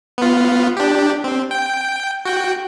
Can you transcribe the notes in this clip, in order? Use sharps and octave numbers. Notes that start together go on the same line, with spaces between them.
B3 F4
D4 G4
C4
G5
F#4 G5